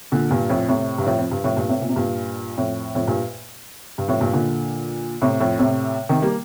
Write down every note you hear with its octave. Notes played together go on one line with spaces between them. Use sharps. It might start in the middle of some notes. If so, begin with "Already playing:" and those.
A#2 D3
G2 A#2
F2 A2
A2 C3
G2
F2 A2
F2
G2
F2 A2
G2 A#2
A2 C3
A#2
C3
G2 A#2
F2 A2
F2 A2
G2 A#2
G2
F2 A2
G2 A#2
A#2 D3
A2 C3
F2 A2
A2 C3
C3 D#3
G3 A#3